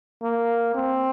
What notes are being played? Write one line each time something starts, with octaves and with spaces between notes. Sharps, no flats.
A#3
C4